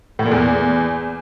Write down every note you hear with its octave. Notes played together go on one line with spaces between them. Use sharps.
A2
A#2
E2